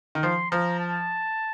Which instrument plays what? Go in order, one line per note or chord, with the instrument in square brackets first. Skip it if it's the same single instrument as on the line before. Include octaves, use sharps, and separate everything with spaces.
[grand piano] D#3
[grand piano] F3 [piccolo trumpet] C6
[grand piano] F3 [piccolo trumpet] A#5
[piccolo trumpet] A5